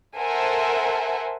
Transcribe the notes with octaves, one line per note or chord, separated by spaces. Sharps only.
A4 A#4 C5 E5 F#5 G#5